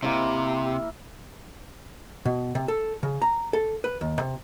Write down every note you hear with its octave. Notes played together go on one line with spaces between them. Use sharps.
C3 A#3 E4 E5
B2
C3
A4
C#3
A#5
A4
B4
D#2
C3